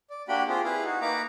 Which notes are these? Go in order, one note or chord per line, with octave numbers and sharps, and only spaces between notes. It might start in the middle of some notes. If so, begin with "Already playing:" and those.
D5
A#3 D4 F#4 G4 G5 B5
C4 F4 G4 G#4
E4 G#4 B4 F5
D#4 F#4
A#3 D#4 B4 A#5 D6